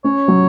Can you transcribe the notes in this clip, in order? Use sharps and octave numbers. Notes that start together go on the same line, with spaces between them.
C#4 C#5
F#3